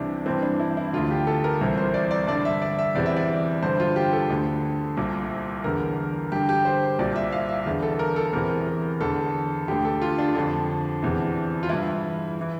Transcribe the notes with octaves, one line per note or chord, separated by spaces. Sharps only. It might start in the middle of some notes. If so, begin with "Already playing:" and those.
Already playing: C2 C3 E3 D4 E4
G2 E3 C4
D4
E4
E4
D2 D3 F4
G4
A4
A#4
C2 C3 E3 A#4
C5
D5
D5
G2 D3 D5
E5
D5
E5
E2 C3 E3 D5
E5
D5
G2 D3 C5
F4
G4
A4
D2 D3
C2 A#2
E2 D3 A#4
G2 D3 G4
G4
C5
C2 A#2 D5
E5
F5
E5
E2 D3
A4
A#4
A4
E2 C3 E3 A#4
A#4
E2 D3 A4
D2 D3 G4
A4
F4
D4
F2 D3
E2 C3 E3
F4
G2 E3 E4
E3